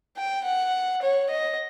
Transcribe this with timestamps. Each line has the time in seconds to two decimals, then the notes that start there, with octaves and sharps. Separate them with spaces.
0.17 G5
0.45 F#5
1.02 C#5
1.30 D#5